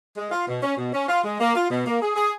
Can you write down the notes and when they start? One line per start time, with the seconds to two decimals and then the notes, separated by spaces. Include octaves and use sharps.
0.17 G#3
0.31 F4
0.48 B2
0.63 C#4
0.77 B2
0.93 C#4
1.09 F4
1.24 G#3
1.40 A#3
1.55 F4
1.70 B2
1.86 A#3
2.01 G#4
2.16 G#4